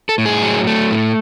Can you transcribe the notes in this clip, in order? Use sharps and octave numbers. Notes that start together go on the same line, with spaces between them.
A4
A2
G#4
F#3
A3
A2